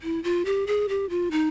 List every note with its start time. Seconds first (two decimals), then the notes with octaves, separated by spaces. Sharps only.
0.02 E4
0.24 F4
0.45 G4
0.67 G#4
0.89 G4
1.10 F4
1.31 D#4